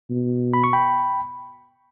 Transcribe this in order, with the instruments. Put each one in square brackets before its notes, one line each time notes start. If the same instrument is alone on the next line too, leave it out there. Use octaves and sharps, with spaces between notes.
[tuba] B2
[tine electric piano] B5
C#6
G5 B5